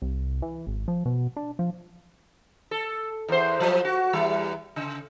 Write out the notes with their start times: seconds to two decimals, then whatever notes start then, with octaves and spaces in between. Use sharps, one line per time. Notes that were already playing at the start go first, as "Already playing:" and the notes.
0.02 C2
0.42 E3
0.67 G#1
0.88 F3
1.05 B2
1.36 D4
1.59 F3
2.71 A4
3.28 E2 C5
3.60 F3 F#3
3.85 F#4
4.13 E2 G3
4.76 C#3